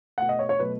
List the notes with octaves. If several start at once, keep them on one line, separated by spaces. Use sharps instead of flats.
B2 A3 F#5
D#5
C#5
C#5
B2 F#3 A3 B4